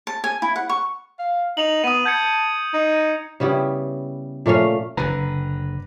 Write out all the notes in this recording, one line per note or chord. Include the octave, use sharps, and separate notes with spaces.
A5
G#5
E4
F#5
C#6
F5
D#4 F7 F#7
B3 D#6 D#7
A5 G6 G#6 C#7
D#4
C#3 G3 B3 E4
A#2 A3 C#4 F5
F#1 D3 B4 A#5